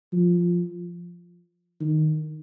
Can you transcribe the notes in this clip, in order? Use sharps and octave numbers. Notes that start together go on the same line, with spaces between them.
F3
D#3